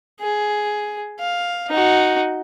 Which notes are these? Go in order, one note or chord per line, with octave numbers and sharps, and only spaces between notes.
G#4
F5
D#4 F#4